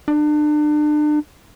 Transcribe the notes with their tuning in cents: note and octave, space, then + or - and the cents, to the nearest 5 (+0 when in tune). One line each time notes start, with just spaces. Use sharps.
D4 +35